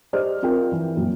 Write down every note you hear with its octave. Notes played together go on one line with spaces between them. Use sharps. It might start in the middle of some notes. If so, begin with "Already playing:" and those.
G4 C5 D5 D#5 F6
C4 F4 A#4 G5
E3
F#2 A#2